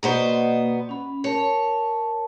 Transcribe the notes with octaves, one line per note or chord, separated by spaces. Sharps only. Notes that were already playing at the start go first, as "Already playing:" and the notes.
B2 A#3 B3 C5 D5 D#5
C#4 B5
A#4 C#5 A5